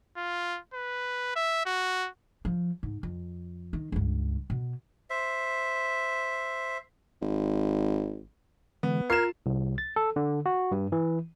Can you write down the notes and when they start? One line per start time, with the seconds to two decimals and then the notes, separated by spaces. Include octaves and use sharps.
0.17 F4
0.74 B4
1.36 E5
1.66 F#4
2.45 F3
2.83 G#2
3.03 F2
3.73 D#3
3.92 C#2 G2
4.50 B2
5.10 C5 E5
7.21 G#1
8.83 D3 E3 G#3 B3
9.10 F4 A#4 G#6 C7 E7
9.46 C2
9.78 A6
9.96 A4
10.16 D3
10.46 F#4
10.71 G2
10.92 E3